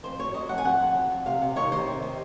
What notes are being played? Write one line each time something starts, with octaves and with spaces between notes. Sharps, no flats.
F2 C5
F#3 C#5
F#3 D#5
F2 F#5
G#5
F2 F#5
F2
F#3
F2
C3 F5
C3
D#3 C#5
D#3 C5
C3
D#3